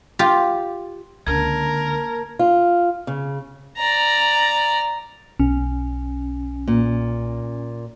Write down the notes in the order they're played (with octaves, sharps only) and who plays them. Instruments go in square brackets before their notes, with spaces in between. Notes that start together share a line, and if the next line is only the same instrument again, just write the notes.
[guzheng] F4 G4
[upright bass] C#2 D3 [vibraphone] A#3 A5 A#5 [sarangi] A#4 [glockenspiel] G#6
[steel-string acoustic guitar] F4
C#3
[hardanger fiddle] D5 A#5
[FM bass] B1 [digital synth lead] C#4
[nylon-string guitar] A#2